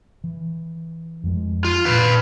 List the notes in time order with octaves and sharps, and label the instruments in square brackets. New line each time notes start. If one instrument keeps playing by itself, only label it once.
[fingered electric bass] E3
F2 F3 G#3
[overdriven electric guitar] F4
[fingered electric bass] A#2 D#3 [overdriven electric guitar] B4 F5